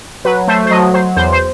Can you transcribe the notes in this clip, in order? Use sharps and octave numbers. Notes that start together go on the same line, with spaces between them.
F#3 B4
A3 C5
C5
F#3 D#5
F#3 C5
E2 C5
C5